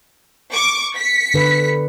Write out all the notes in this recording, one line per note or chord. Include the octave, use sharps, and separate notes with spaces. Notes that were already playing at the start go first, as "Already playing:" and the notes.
C#6 D6
B6 C#7
D3 B4